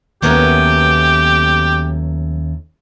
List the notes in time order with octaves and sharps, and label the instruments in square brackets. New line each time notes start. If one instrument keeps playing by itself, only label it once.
[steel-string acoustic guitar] D#2 A3 C#4 [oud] F#3 B3 A#4 [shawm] G4